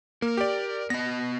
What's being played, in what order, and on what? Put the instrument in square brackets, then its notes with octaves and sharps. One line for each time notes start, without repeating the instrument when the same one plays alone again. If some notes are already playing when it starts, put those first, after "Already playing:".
[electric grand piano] A#3 [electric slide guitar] A#4
[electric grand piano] G4 D5
[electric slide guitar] B3 D#5 [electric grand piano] A#6